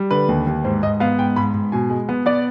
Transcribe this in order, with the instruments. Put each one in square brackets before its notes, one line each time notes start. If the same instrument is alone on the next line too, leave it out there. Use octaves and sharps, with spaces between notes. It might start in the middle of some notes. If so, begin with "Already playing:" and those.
Already playing: [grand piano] G3
D3 B4
D#2
D#2
G#2 C5
G#2 D#5
B3 F5
G#2 G5
G#2 B5
G#2
B2 G#5
G#3
B3
B3 D5